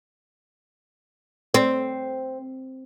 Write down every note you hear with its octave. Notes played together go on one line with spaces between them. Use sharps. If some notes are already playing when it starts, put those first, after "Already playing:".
C4